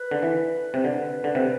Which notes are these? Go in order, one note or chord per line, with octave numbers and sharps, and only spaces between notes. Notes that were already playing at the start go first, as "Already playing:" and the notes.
Already playing: B4
D3
E3
C3
D3 B4
D3
C3